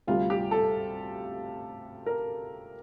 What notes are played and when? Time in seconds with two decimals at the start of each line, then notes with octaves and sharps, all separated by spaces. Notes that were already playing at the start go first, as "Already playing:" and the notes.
0.07 D2 C3 G3 F4
0.30 G4
0.51 A4
2.06 A#4